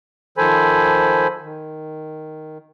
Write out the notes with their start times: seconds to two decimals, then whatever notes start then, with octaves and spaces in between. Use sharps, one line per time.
0.38 D#3 F3 A4 C5 G#5 B5
1.42 D#3